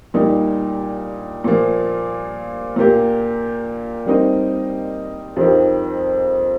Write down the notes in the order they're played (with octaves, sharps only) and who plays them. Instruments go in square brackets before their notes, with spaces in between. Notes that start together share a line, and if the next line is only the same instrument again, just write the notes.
[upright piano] A#2 G3 D#4 A#4
A#2 F3 A#3
A#2 A#3 G4 A#4
G3 C4 D#4 A#4 D#5
F2 F3 D#4 G4 A#4